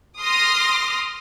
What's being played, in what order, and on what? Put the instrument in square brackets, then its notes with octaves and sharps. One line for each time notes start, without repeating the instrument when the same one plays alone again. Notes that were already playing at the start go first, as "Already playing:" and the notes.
[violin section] C6 D#6 F6 A#6